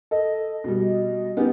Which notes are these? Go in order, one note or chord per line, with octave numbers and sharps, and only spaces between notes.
A4 D#5
B2 G3
B3 C#4 D#4 G4